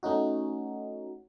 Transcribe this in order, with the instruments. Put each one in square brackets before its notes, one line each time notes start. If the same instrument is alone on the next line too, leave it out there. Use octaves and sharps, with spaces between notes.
[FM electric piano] A3 C#4 D#4 F#4